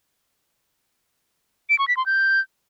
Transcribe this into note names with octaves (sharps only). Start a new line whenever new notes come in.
D7
C#6
B6
C6
G6